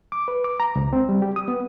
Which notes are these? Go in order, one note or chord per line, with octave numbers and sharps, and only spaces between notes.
D6
B4
D6
A#5
C#2
C4
G3
G4
D#6
B3